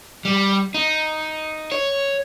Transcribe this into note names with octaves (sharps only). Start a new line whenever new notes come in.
G3
D#4
C#5